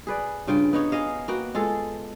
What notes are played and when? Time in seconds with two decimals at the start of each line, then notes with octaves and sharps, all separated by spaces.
0.07 G#4 B4 D5
0.47 G2 C#3 F4 G5
0.73 B3 D#4 C#5
0.92 G#4 D#5 F5
1.28 A#3 B3 F#4 G5
1.55 G#3 F4 G#4 A4